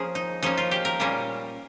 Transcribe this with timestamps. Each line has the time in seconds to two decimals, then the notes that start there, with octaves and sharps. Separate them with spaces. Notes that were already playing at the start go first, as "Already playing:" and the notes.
Already playing: F3 A#3 C#4 G#4 A#4
0.15 D#4
0.43 F3 A#3 C#4 D#4
0.57 F4
0.71 G4
0.85 A#4
1.00 A#2 G3 A#3 C#4